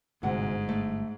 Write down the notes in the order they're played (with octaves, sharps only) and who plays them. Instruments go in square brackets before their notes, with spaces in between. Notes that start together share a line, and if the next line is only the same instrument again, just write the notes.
[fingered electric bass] G1 [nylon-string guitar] D2 C3 F#5 [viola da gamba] G#2
[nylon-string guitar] A3